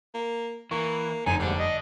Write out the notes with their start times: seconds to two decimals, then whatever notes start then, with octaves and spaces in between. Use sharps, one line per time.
0.14 A#3
0.71 E3 A#3 C#6
1.26 F1 D3 D#4 G#5
1.40 D#2 G#2 D3 G3 D4
1.59 D#5